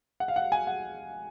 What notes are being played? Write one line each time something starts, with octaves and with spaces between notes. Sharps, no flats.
F#5
F5
F#5
G#5
F#5